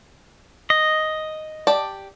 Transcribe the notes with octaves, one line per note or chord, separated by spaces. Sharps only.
D#5
G4 D5 A5